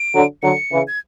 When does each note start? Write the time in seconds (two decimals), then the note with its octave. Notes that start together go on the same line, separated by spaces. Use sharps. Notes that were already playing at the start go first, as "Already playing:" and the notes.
Already playing: D7
0.13 D3 F#3
0.42 D3 F#3 C#7
0.70 C#3 E3
0.88 G#6